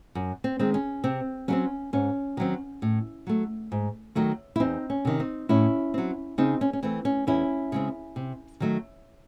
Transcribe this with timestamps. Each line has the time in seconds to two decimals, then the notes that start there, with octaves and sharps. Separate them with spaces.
0.15 F#2
0.44 C4
0.59 D#3 G#3 C4
0.74 C#4
1.04 C3 C4
1.48 F#3 A3 C4 C#4
1.93 G#2 C#4
2.37 D#3 F#3 C4
2.82 A2
3.27 F#3 A3
3.72 G#2
4.15 D#3 F#3 A3
4.56 E4
4.60 E2 C4 D#4
4.90 C#4
5.05 C3 D#3
5.20 C4 D#4
5.49 A2 C#4 E4
5.94 F#3 C4
6.38 C#3 C4 D#4
6.61 C#4
6.73 C#4
6.83 E3 A3 C4
7.05 C#4
7.27 E2 C#4 E4
7.72 C#3 G#3 C4
8.16 C3
8.60 D#3 F#3 A3